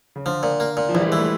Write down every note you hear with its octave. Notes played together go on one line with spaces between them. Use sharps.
C#3
D3 F3
A#2
A#3
A#2
F3
A#1 E3
G3
G#3
E3
A3